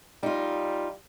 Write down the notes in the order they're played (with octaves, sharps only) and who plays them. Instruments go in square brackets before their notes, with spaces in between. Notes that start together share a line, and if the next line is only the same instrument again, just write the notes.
[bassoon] G3 [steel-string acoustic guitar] D#4 F4